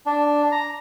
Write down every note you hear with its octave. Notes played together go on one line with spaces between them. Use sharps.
D4
A#5